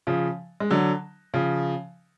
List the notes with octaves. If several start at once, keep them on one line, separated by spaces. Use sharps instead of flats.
C#3 F3
G#3
D3 F#3
C#3 F3